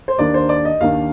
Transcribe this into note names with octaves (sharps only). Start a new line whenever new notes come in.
C5
D#2 D#3 A#3 D4 D5
C5
D5
D#5
D#2 D#3 A#3 D4 F5